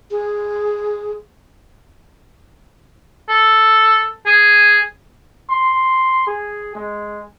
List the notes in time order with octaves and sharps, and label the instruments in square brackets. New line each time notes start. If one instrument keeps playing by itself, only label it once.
[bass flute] G#4
[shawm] A4
G#4
[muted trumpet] C6
G#4
G#3